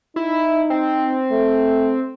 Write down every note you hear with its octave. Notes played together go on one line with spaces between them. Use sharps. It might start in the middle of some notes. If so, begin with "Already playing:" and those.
D#4 E4
C4
A3